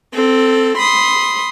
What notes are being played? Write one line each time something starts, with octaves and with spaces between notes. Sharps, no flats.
C4 A4
B5 C6 D#6